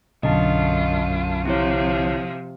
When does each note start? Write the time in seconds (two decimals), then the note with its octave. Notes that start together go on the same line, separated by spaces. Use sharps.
0.23 B1 F#2 D3 F4 D#5 A5
1.45 C3 F3 C4 E4 C#5